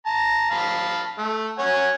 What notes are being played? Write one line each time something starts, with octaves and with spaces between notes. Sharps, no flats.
A5 A#5
F5 A5 B5
A3
C#5 F#5 G#5